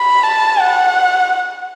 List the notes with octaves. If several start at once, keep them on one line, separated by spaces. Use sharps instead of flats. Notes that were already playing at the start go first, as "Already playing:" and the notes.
Already playing: B5
A5
F#5